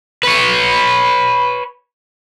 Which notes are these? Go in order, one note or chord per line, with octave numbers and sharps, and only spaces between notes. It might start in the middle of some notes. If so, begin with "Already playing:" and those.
B4 C#5